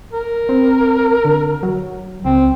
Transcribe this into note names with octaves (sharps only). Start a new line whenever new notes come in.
A#4
C4
D3
F#3
C#2 C4